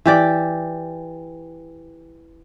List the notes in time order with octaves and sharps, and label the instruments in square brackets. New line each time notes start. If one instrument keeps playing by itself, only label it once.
[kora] E3 G4 D5